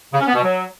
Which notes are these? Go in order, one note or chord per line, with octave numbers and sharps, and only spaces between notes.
C#3
C#4
B3
B2
F#3